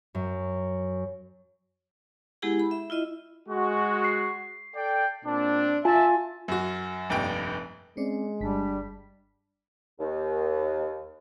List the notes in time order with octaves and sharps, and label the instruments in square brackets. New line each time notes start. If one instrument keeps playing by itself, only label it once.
[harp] F#2
[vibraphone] G#3 B3 E4 G4 G#4 F#5
B5
E5
E4 F4 D#5 E5
[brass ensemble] G#3 F#4
[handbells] C7
[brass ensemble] A4 D5 G5
A#2 C4 D4
[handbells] F4 G#5 [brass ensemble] E5 A5
[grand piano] F#2 F#4
F1 A#1 G2 G5
[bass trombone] G#3 [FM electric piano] C4 C#4 D5
[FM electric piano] G1 B6 [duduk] G3 [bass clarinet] D4
[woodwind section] D#2